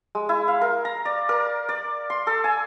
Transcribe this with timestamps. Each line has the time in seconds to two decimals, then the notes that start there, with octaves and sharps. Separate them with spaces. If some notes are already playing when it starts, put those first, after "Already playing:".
0.15 G#3
0.29 E4
0.48 F5
0.61 A#4
0.85 A#5
1.05 D5
1.29 A#4
1.69 D5
2.10 C6
2.27 A4
2.44 G#5